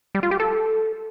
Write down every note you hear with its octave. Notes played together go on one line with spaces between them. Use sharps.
G3
F4
G4
A4